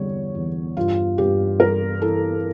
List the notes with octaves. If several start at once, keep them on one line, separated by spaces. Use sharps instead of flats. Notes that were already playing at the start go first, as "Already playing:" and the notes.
Already playing: E2 D3 G3 C#5
E2
G2 F4
G2 G4
G3 A#4
E3 A4